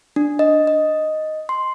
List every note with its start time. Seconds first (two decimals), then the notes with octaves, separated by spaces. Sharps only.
0.16 D4
0.39 D#5
0.67 D#5
1.49 C6